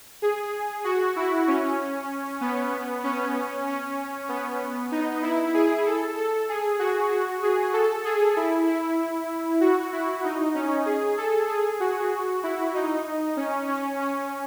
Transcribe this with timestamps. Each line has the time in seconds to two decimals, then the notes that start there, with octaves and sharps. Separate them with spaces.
0.22 G#4
0.84 F#4
1.16 E4
1.48 C#4
2.41 B3
3.04 C#4
3.66 C#4
4.29 B3
4.92 D#4
5.22 E4
5.54 G#4
5.86 A4
6.17 A4
6.49 G#4
6.79 F#4
7.11 F#4
7.43 G#4
7.73 A4
8.05 G#4
8.37 E4
8.67 E4
9.61 F#4
9.93 E4
10.24 D#4
10.55 C#4
10.86 G#4
11.17 A4
11.49 G#4
11.80 F#4
12.43 E4
12.74 D#4
13.37 C#4
13.68 C#4
13.99 C#4